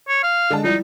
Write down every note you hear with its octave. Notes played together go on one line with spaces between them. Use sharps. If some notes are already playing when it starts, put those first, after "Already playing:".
C#5
F5
D3 G#3 A5
F3 G3 D#4 E4